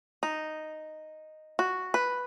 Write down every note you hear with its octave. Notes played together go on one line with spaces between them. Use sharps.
D#4
F#4
B4